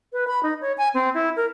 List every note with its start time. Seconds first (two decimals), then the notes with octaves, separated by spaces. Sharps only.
0.13 B4
0.28 B5
0.43 D#4
0.61 C#5
0.78 G#5
0.94 C4
1.14 E4
1.36 A#4